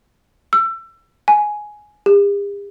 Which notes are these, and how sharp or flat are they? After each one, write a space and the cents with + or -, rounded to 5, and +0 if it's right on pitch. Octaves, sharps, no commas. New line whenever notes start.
E6 +30
G#5 +10
G4 +45